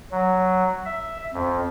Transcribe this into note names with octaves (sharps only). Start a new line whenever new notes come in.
F#3
E5
F2